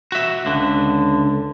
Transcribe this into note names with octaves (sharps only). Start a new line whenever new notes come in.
F#4 E5
C#2 D3